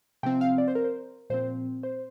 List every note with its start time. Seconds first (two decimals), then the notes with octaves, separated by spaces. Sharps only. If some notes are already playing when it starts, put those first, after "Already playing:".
0.23 C3 F3 C4 G5
0.41 F5
0.58 D5
0.68 C5
0.75 A#4
0.84 C5
1.30 A#2 F3 C4 C5
1.83 C5